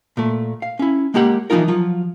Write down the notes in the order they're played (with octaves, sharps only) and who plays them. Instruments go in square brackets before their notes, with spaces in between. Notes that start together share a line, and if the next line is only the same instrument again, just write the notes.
[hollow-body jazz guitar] A#2 A3
F5
C#4 E4
G#3 A#3 G4 F#5
E3 F3 C4 D#4 F4 A#4
F3 F#3 F4